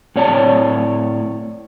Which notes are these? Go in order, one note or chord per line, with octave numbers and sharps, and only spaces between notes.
A2 C4 C#5 D5 A5